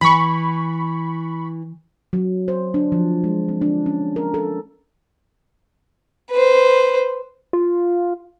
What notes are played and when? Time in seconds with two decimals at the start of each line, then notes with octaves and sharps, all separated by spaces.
0.01 E3 B5 C#6
2.13 F#3
2.48 C5
2.74 D4
2.92 F3
3.24 G#3
3.49 C4
3.61 D4
3.86 C#4
4.16 A#4
4.34 A4
6.31 B4 C5
7.53 F4